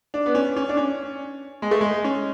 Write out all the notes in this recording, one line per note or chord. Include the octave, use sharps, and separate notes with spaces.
D4
B3
C#4
C#4
D4
C#4
G#3
A3
G#3
C#4